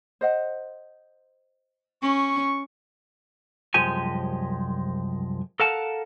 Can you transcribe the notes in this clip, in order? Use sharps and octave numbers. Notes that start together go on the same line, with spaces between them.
C5 D#5 F#5
C#4 C#6
C2 F#2 F3 G#3 G4 G#5
A4 A#4 F5 F#5 A5